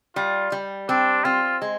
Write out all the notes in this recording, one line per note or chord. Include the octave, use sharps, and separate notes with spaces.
G3 F4
G3
C4 D4
C4 F4
G#3